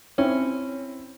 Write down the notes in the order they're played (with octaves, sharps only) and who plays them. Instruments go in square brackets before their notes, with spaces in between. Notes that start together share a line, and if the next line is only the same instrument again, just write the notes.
[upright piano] C4 E4 [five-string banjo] C#4